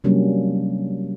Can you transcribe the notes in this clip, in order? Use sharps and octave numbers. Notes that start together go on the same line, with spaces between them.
C3 F#3 G3 A#3 C#4 D4